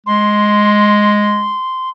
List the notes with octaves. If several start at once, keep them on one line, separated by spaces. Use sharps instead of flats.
G#3 C6